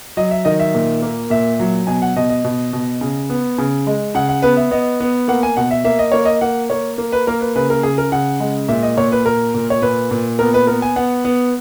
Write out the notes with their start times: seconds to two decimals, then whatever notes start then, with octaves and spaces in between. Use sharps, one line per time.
0.17 F#3 D#5
0.31 E5
0.45 D#3 D#5
0.60 E5
0.74 A#2
1.02 A#3
1.30 A#2 E5
1.60 F#3
1.87 B2 G#5
2.02 F#5
2.16 B2 D#5
2.29 D#5
2.44 B2
2.73 B2
3.01 C#3
3.30 B3
3.58 C#3
3.87 G#3
4.15 C#3 F#5
4.29 F#5
4.42 B3 B4
4.57 E5
4.71 B3 D#5
5.00 B3
5.28 A#3 F#5
5.43 G#5
5.57 B2 F#5
5.71 E5
5.84 A#3 E5
5.99 D#5
6.12 A#3 C#5
6.25 D#5
6.41 A#3 F#5
6.70 A#3 C#5
6.98 A#3
7.12 B4
7.27 A#3 A#4
7.41 B4
7.56 C#3 B4
7.70 A#4
7.83 C#3 G#4
7.98 A#4
8.12 C#3 F#5
8.40 G#3
8.68 A#2 E5
8.83 D#5
8.97 A#2 C#5
9.12 B4
9.26 A#2 A#4
9.54 A#2
9.70 C#5
9.82 A#2 B4
10.11 A#2
10.39 B3 A#4
10.54 B4
10.67 B3 A#4
10.82 G#5
10.96 B3 F#5
11.25 B3